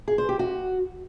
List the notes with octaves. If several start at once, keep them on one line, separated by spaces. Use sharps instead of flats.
G#4
C5
G4
F#4